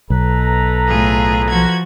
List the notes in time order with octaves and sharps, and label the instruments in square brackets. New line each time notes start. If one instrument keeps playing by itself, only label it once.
[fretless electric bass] B1 [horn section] A4 B4 A#5
[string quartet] A2 F4 G#4
F3 F#4 G#6